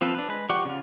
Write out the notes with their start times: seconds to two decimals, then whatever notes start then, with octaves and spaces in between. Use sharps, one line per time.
0.01 F3 C4 F4 A4 B4
0.15 D4 B4
0.29 G#3 B4
0.49 F3 G4 D5 F#5 C#6
0.65 C#3 F4